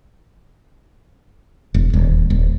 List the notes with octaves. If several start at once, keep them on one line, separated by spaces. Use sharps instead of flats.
E1
D#1
D#1